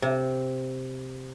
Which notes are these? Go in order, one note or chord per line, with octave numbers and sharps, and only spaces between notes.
C3